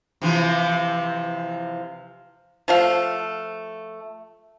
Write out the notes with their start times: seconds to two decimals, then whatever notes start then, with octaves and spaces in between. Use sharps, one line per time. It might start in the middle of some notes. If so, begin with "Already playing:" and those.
0.22 C3 E3 F3
2.68 F3 A3 F5